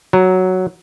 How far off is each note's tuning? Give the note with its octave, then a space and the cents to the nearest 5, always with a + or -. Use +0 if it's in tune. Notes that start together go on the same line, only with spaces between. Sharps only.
F#3 +0 A#5 +0